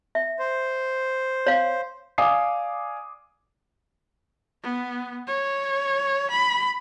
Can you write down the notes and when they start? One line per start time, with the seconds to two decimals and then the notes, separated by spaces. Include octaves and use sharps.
0.15 E5
0.39 C5
1.47 C#5 F5
2.18 D5 F5 G#5 D6 D#6 C7
4.63 B3
5.27 C#5
6.31 B5